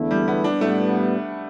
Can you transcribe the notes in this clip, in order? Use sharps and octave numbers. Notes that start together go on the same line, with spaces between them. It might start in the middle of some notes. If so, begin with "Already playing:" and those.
Already playing: E2 D3 A3 E4
G3
B3
D4
A2 G3 A3 B3